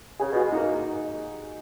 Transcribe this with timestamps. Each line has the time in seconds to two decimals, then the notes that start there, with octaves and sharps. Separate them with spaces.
0.20 C#3 G#4
0.31 B2
0.36 F#4
0.44 G#3
0.52 A#3 D#4